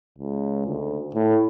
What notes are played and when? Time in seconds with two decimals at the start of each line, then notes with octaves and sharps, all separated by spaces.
0.18 C#2
0.66 D2
1.15 A2